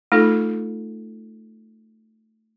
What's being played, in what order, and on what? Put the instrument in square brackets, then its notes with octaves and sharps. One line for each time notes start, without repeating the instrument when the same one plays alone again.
[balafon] A3 D#4 F4 A4